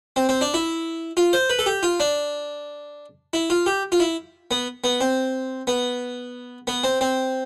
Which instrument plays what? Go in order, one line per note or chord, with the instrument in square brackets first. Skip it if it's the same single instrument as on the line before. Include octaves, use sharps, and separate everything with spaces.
[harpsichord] C4
C4
D4
E4
F4
C5
B4
A4
G4
F4
D4
E4
F4
G4
F4
E4
B3
B3
C4
B3
B3
C4
C4